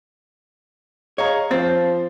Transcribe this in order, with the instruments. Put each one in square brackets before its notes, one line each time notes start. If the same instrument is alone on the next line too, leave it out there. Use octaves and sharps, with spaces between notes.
[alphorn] G#4 [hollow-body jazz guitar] C#5 [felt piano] D#5 F5 A#5
[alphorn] F3 [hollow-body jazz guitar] C4 [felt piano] C5 A6